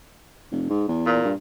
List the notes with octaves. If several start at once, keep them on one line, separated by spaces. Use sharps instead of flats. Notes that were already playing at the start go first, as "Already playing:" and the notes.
F1
G#2
E2
A#2
G2